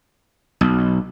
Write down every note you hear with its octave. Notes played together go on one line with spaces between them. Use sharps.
B1